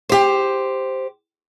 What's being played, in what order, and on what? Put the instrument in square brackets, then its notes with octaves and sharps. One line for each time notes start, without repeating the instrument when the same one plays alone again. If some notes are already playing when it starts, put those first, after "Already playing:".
[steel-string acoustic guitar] G4 C5